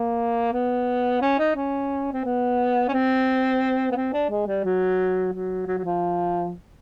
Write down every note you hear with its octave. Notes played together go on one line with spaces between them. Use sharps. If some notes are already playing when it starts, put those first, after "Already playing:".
Already playing: A#3
B3
C#4
D#4
C#4
C4
B3
C#4
C4
B3
C4
D4
G#3
G3
F#3
F#3
F#3
F#3
F3